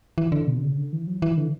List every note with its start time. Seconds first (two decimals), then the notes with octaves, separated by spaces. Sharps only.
0.18 E3
0.32 D3
0.47 B2
0.58 D3
0.62 C#3
0.77 D3
0.93 E3
1.07 F#3
1.22 E3
1.37 D3